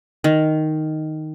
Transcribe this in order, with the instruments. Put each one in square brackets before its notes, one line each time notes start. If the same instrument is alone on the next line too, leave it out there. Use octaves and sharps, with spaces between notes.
[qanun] D#3